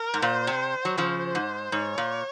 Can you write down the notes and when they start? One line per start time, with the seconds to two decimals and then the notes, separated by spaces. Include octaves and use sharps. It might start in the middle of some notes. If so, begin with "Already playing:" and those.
Already playing: A#4
0.14 G#2
0.22 A#2 C5
0.47 C3
0.85 F#3
0.97 C#3 F3 C5
1.35 G#2
1.72 G#2 C#5
1.98 A#2